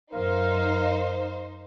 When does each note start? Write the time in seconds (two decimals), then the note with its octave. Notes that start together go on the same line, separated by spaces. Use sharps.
0.13 F#2 D#4 A#4 C5 F5